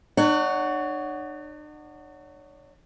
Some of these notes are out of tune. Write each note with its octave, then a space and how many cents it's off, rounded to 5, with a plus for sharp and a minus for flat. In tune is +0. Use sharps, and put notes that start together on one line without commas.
D4 +45 C#5 +15 F#5 +0